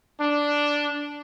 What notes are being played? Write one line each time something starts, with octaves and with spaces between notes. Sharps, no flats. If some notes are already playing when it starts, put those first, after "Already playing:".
D4